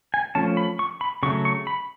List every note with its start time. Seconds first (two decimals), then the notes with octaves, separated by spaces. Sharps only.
0.14 G#5
0.35 F3 A3 C#4 A5
0.57 B5
0.79 C#6
1.01 B5
1.23 C#3 F#3 A3 C#6
1.45 C#6
1.67 B5